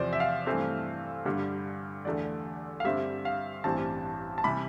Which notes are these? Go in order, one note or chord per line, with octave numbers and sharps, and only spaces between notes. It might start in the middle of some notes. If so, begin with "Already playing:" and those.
Already playing: E2 C3 F3 C5 D5
E5
F5
G2 E3 A3 C4
G2 D3 G3
E2 D3 A3 D5
F5
G2 D3 G3 C4 E5
F5
A1 G2 E3 G3 C4 A5
A5
C3 E3 G3 B5